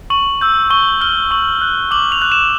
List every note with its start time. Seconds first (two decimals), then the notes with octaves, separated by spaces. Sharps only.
0.10 C#6 F#7
0.41 E6 G6
0.70 C#6 G7
1.01 F6 G7
1.31 C#6 F#7
1.61 F#6
1.91 D6 F#7
2.12 F7
2.22 F#6
2.32 E7